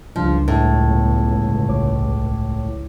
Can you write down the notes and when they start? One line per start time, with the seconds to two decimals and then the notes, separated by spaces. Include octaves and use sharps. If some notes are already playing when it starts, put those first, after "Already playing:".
0.16 G1 C#2 C#3 F3 G3 D4
0.48 A2
0.88 G2 F#3 B3
1.68 A#1 C#5 D6